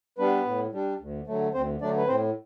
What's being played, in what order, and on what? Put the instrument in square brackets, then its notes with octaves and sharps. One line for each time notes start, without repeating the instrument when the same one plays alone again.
[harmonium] G3 B3 D4 B4
A2
G3 D4
D2
D3 F#3 A3
D2 C4 C5
D3 F#3 A3 D4 D5
B4
A2 C4 C5